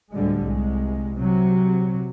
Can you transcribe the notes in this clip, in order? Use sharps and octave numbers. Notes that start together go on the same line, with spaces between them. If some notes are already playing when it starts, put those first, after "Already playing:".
D2 A2 D3 G3 G#3
C2 G#3
C3 F#3